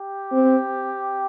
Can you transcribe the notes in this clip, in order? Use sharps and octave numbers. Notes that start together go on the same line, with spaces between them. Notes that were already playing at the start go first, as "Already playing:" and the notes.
Already playing: G4
C4